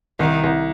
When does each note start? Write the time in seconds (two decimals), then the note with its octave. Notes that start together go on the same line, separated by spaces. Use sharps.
0.19 C2 D#3
0.44 C2